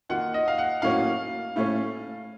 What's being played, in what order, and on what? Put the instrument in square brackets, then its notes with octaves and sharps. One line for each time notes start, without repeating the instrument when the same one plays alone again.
[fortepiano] D#3 A#3 F4 [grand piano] F#5
[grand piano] D#5
F5
F#5
[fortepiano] A2 F#3 A#3 C#4 [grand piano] F5
[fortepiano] A2 A3 C#4